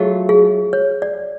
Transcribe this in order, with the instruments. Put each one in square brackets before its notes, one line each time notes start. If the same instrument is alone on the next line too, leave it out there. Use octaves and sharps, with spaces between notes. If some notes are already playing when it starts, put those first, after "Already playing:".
Already playing: [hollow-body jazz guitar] F#3 A3 F4 [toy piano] G#4
[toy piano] G#4
C#5
D5